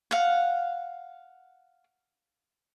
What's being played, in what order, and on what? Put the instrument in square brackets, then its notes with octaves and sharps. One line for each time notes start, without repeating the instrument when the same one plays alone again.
[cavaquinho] F5 F#5